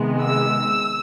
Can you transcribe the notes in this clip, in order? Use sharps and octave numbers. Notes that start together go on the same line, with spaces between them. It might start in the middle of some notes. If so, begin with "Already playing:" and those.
Already playing: C3 D#3 G#3 B3
E6